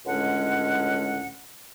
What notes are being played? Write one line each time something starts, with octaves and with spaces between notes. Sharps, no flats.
C#2 A2 D3 G#3 C#4 F#5